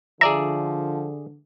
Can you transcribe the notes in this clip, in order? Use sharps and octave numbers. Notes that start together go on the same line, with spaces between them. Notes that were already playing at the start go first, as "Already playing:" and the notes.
D3 F3 G#4 D5 E5 A#5